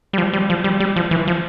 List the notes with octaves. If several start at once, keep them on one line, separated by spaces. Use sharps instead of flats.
G3
F3
G3
F3
G3
G3
F3
E3
F3